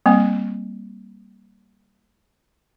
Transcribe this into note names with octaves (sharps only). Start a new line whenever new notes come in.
G3 A#3 C4